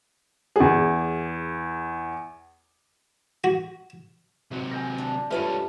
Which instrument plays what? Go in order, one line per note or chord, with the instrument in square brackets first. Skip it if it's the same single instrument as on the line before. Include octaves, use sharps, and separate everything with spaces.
[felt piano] E2 G#4
[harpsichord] F#4
[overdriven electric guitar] C3 F#3
[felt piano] G#5 G6 A#6
[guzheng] D4
[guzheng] G2 A3 A#4 [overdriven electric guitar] G3 C#4 [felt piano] F4 B4 E5